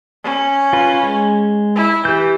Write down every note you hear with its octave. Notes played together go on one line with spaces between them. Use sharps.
C#4
F4 B4
G#3
E4
E3 G4 G6